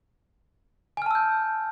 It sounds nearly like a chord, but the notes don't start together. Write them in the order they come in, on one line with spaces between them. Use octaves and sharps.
G#5 F6 A5 E6 G6